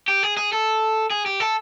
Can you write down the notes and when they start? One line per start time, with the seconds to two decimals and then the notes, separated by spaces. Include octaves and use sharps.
0.08 G4
0.23 G#4
0.37 G#4
0.53 A4
1.10 G#4
1.26 G4
1.40 A4